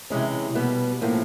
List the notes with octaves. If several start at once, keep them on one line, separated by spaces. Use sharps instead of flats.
C3 E3 G#3 C#4
B2 G3 B3
A2 F3 A#3 C#4